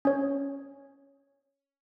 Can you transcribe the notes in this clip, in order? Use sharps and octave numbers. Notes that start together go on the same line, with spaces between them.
C#4 C#5